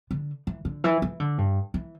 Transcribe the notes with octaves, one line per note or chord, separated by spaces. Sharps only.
D3
E3
D3
E3
E3
D3
G2
E3